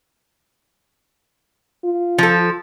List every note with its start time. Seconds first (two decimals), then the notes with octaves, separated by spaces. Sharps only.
1.84 F4
2.18 F3 A4